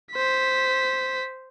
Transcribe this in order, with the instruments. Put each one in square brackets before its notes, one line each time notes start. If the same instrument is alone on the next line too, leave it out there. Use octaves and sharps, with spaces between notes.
[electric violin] C5 B6